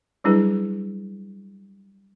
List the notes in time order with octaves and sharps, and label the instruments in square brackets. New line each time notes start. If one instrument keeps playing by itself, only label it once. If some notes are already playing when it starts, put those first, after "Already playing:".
[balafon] F#3 G3 D4 E4 G#4 B4